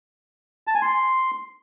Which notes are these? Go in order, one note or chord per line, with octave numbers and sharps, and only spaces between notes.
A5
G#5
C6